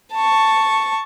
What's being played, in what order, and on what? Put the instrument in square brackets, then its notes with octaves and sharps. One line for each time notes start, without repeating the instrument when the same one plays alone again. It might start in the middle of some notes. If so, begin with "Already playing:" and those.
[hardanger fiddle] A5 C#6